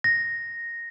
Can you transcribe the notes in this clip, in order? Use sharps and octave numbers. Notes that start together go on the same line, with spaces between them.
A#6